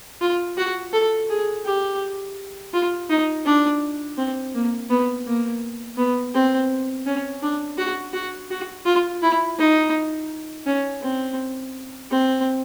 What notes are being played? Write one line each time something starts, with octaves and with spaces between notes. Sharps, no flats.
F4
F#4
A4
G#4
G4
F4
D#4
D4
C4
A#3
B3
A#3
B3
C4
C#4
D4
F#4
F#4
F#4
F4
E4
D#4
C#4
C4
C4